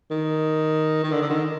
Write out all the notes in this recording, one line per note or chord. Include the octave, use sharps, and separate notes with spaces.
D#3
D#3
D3
D3
D#3